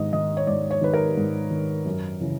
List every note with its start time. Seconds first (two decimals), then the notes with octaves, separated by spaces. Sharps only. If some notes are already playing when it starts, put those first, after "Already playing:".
Already playing: G#2 D#3 D#5
0.13 D#3 D#5
0.37 C#5
0.47 G#2 D5
0.71 C#5
0.81 D#3 B4
0.94 A#4
1.17 G#2
1.50 D#3
1.85 F#2
2.21 C#3 E3